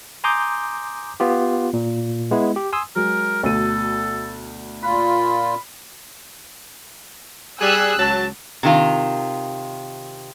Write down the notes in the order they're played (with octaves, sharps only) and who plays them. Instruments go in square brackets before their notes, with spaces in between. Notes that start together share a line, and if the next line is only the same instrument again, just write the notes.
[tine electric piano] G#5 A#5 C6 D6 D#6 G6
B3 F4 G4
A#2
G#3 B3 E4
G4
G#5 C6 D#6 E6
[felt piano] F#3 G#3 [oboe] A#4
[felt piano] D2 B2 D#7 [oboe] A4
[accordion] A#2 F4 [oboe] B5
[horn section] G3 G#4 [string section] D#6 E6 F#6
[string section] C#2 [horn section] F#3 A5
[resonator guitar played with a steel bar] C3 D#3 F4